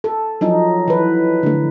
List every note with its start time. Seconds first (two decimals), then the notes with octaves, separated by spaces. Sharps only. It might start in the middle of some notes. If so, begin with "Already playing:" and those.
0.04 A4
0.41 F3 F#3 D#4
0.88 E3 B4
1.43 D3 A3